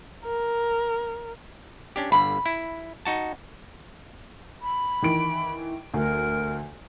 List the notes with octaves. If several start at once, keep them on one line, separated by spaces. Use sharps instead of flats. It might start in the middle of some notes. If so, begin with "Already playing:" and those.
A#4
C#4 D4 G4
G1 D3 B5
E4
D#4 F#4 A5
B5
D#3 E3 D7
D2 A#4